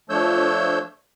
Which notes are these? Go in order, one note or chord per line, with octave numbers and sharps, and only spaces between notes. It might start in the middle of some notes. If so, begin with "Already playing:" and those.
F3 A3 D4 C#5 E6 G6